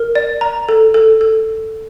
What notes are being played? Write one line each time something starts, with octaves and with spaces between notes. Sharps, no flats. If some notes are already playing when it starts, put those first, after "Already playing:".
Already playing: A#4
D5
A#5
A4
A4
A4